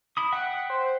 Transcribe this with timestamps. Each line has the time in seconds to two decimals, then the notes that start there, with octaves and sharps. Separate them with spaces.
0.17 E4 B5 D#6
0.32 E5 F#5 G5
0.70 C5